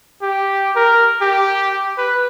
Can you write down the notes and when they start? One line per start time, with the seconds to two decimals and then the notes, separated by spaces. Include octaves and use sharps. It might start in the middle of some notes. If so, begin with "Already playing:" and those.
0.22 G4
0.76 A#4
1.21 G4
1.98 B4